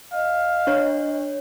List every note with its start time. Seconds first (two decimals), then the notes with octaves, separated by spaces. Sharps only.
0.14 D#5 F5
0.67 D4 C#5